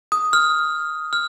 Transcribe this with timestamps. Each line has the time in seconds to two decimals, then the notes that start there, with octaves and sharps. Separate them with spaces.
0.12 D#6
0.33 F6
1.13 F6